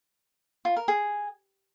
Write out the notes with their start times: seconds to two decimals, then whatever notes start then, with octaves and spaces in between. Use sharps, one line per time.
0.65 F4
0.77 A#4
0.88 G#4